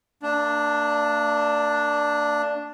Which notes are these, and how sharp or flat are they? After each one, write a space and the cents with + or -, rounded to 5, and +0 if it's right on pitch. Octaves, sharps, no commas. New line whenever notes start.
A#3 -45 D4 +0